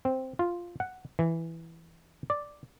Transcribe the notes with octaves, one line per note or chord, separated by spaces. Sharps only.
C4
F4
F#5
E3
D5